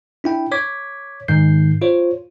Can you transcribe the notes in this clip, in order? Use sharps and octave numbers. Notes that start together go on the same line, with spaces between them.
D4 E4 G5
C#5 D6 G#6 B6
G#2 D#3 G6 C7
F4 C5 C#5